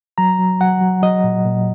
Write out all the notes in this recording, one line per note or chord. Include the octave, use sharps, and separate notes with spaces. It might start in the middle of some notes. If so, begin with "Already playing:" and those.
F#3 A#5
F#3
F#3 F#5
F#3
F#3 D#5
A#2
A#2